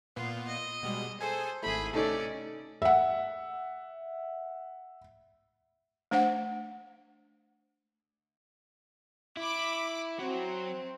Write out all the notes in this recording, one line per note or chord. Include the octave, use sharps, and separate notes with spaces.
A#2 B3 F4
D#5
B2 G3 G#3
G#4 A4 C5 G#5
G#1 A3 E4 G#4 B5
C3 A3 C#4 D#4 A4 D5
E5 F#5
A3 D4 C5 F#5
E4 B5 D6
F#3 C4